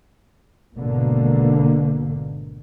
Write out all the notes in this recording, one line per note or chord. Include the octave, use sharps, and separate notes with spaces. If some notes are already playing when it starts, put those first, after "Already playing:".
G#1 B2 D3 A#3